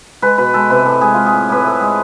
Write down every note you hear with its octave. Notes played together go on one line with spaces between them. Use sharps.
G#3 B4
B2 B4
G#3 A4
C3 B4
A2 A4
G#3 G#4
G#3 F4
G#4
A2
A2 B4
A3 A4
G#3 G#4